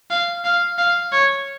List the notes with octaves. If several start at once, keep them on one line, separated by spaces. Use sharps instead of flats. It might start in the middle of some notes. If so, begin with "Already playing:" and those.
F5
F5
F5
C#5